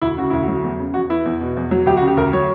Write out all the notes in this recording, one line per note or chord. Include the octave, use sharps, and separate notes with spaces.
D2 E4
C#3 F#4
D2 E4
F#3 F#4
E2
C#3
E2 F#4
E3 E4
E2
B2
E2
F#3
D2 G4
F#4
C#3
G4
D2 A#4
F#3 C#5